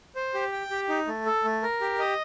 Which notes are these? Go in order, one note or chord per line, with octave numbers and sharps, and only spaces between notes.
C5
G4
G5
G4
D#4
A3
A4
A3
A#4
G4
D#5